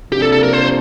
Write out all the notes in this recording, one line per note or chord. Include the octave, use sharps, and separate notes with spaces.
C3 F3 A#3 D4 G4
A4
A4
A#4
C5